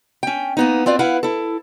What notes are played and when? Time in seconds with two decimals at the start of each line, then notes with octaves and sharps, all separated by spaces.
0.23 C#4 G5
0.57 A#3 B3 D#4
0.86 C4 F4 B4 D5
0.99 E4 B4 F5 F#5
1.23 E4 A4